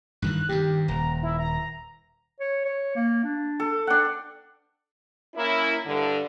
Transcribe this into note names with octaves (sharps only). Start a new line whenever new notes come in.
G2 D#3 E3 F#6
G2 D#3 G4
D#1 A#5
E4
A#5
C#5
C#5
A#3
D4
A4
D4 F#5 G5
A#3 C#4 E4
G2 D3